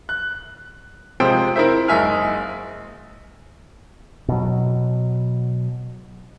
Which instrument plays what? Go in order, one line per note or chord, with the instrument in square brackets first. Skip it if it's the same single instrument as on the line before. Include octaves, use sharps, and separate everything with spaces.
[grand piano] F#6
C3 F3 G#3 C5 G5 D7
E4 A#4 C5 E5
F#1 G#3 D#4 E5 G#5 F6
[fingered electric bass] B2 F#3